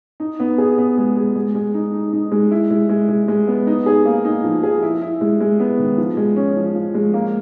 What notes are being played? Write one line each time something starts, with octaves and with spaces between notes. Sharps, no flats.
D#4
B3
G#4
B3
G#3
G#3
G#3
G#3
D#4
D#4
D#4
G#3
E4
G#3
G#3
G#3
G#3
B3
D#4
G#4
A#3
D#4
F3
G#4
E4
E4
G#3
G#3
B3
D#3
F3
G#3
C#4
F3
F3
G#3
A#3